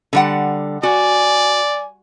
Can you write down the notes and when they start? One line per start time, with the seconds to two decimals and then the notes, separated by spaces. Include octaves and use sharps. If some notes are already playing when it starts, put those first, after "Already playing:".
0.13 D3 G3 F#5
0.83 F#4 D5 G#5